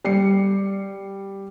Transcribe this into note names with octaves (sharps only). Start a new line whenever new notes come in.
G3 C7 C#7